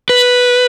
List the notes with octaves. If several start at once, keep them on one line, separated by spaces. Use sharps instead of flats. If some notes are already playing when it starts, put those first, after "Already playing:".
B4